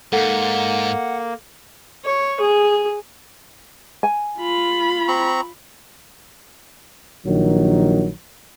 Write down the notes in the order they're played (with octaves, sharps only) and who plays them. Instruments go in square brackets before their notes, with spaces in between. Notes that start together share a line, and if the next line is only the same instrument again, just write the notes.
[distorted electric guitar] G#2 [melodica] A#3 [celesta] A4 [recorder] F#5
[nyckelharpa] C#5
G#4
[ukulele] G#5
[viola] F4 B5
[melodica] C4 A#5 C#6
[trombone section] A#1 D#3 F#3